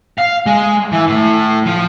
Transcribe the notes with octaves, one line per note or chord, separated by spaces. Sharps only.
F5
G#3
E3
A2
F3